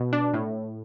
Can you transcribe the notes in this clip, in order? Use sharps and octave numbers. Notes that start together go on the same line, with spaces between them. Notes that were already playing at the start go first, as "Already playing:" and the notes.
Already playing: B2
D4
A2